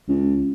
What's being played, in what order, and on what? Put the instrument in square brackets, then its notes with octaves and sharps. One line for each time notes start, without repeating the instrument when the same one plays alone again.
[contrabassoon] C#2